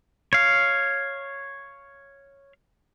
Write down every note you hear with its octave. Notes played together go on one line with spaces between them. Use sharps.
C#5 F5